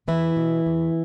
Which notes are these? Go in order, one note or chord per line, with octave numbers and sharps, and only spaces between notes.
E2 E3 E4
B2
E2